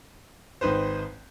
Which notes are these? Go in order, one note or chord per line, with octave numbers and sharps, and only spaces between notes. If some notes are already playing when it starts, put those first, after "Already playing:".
G#1 D#4 B4 C5